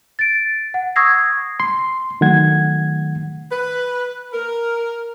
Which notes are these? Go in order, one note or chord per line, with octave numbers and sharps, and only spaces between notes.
A6 D7
F#5
C#6 D#6 E6 G#6 A#6 C7
C6
D#3 F#3 A3 F#5 G#6
B4
A#4